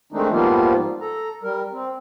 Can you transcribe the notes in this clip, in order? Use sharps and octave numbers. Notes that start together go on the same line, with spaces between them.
D#3 G#3 A3 C4 D4 D#4
G#2 F3 G3 A#3 B3 F4
A4 A#5
G3 A#4
C4